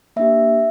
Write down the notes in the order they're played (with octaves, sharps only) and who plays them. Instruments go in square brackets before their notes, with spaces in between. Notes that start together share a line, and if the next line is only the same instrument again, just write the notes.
[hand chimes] A#3 D4 G4 E5